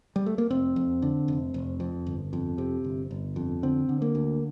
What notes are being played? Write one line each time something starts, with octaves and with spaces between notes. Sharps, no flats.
G3
A3
A#3
F1 C4
F2
D3
F1
F1
F2
G1
F2
C3
G1
G1
F2
D3 C4
D3
A#3
D2